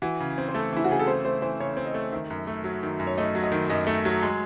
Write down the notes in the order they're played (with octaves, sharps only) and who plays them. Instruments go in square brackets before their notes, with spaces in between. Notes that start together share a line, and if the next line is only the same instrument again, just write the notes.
[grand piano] E3 [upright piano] F#4
[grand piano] C#3
C4
[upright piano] C5
[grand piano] A3 [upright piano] A4
[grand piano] E3 [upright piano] E4
[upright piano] F#4
[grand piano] C#3 [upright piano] G#4
[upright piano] A4
[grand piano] C4 [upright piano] C5
[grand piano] A3 [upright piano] C5
[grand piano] E3 [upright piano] C5
[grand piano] C#3 [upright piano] C#5
[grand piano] C4
[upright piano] D#5
[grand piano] A3
[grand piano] D#3 [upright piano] E5
[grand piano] F#2
A3
F#3
D#3
F#2
[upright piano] C#5
[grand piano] A3 [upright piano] D#5
[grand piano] F#3
[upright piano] D#5
[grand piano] D#3
[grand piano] F#2 [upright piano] D#5
[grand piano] A3
F#3
G#3